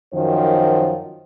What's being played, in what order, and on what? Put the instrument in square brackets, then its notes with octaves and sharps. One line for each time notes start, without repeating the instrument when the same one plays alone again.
[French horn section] F#2 D#3 F3 C5